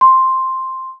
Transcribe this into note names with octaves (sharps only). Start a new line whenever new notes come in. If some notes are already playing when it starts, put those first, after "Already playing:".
C6